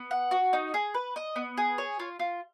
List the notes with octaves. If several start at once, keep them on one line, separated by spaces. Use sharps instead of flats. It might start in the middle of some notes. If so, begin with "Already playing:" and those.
Already playing: B3
F#5
F#4
D#4
G#4
B4
D#5
B3
G#4
C#5
F4
F4